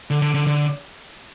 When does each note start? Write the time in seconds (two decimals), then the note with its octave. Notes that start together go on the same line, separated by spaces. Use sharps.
0.10 D3
0.22 D3
0.34 D3
0.47 D3